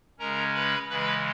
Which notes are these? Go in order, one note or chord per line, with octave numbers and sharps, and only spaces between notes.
C#3 G#3 C#4 A#4 A#5
B4 B5
C#3 E3 G#3 B4 B5